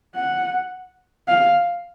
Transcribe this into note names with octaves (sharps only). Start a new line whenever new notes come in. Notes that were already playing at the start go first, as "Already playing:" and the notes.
F#5
F5